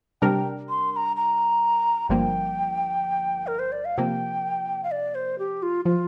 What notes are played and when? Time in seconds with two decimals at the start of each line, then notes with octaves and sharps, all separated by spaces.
0.22 C3 G3 D4 A#4 G5
0.69 C6
0.92 C6
0.96 A#5
1.16 A#5
2.09 G1 G2 F3 A#3 G5
3.47 A#4
3.59 C5
3.72 D5
3.85 F5
3.98 C3 F3 A#3 G5
4.84 F5
4.91 D5
5.15 C5
5.39 G4
5.63 F4
5.85 F3 F4